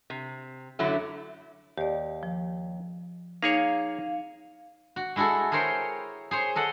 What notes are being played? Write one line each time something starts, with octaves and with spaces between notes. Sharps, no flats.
C3
F#2 D3 F#3 A3 E4
D#2 G4 D5
F3
A#3 D#4 G#4 C#5 F5
F#4
G#3 E4 F#4 G#4 A4
G#4 A#4 C5 C#5 G5
G#4 C5 C#5
A4 D#5 F#5